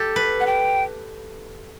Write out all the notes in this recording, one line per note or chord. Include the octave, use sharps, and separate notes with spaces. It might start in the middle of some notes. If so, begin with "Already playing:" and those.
Already playing: G4 A4
B4
F#5
G5